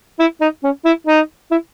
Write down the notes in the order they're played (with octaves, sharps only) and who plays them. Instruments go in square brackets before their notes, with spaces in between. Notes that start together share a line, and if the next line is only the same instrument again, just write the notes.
[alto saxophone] E4
D#4
C#4
E4
D#4
E4